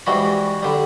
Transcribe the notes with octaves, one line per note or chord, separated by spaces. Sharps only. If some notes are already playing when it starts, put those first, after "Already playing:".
G#2 E3 G3 F#4
D3 G3